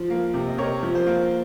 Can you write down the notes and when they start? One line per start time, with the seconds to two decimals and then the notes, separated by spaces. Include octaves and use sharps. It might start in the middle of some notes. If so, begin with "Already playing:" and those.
Already playing: F3
0.10 A#3
0.34 C3
0.48 D#5
0.58 C3 A#4 C#5
0.83 F3
0.95 C5
1.07 A#3